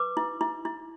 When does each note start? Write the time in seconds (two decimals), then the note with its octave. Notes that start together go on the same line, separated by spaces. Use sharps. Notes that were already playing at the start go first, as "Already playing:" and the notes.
Already playing: B4 D6
0.17 E4
0.41 E4
0.65 E4